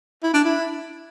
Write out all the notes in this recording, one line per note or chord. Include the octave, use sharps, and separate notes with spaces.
E4
D4
E4